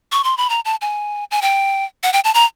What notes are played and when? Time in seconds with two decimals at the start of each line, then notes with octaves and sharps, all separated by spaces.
0.12 C#6
0.24 C6
0.37 B5
0.50 A#5
0.65 A5
0.81 G#5
1.31 G#5
1.42 G5
2.03 F#5
2.13 G5
2.24 A5
2.34 A#5